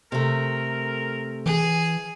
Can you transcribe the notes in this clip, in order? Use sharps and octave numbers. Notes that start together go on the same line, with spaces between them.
C3 A3 A#4
E3 G#4